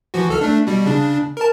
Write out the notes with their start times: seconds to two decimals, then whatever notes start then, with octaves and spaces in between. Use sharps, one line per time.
0.14 E3 F3 F#4
0.29 C#2 A4 F6
0.41 A3 D4
0.67 B2 G3
0.86 C#3 D4
1.37 A#4 A5